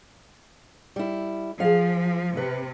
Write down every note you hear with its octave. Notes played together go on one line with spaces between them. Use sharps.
G3 E4
F3 G#4 F5
C3 B4